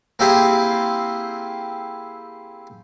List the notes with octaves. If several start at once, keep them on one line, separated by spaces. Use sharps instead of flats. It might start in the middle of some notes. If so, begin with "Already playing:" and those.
A#3 C4 E4 G4 G#4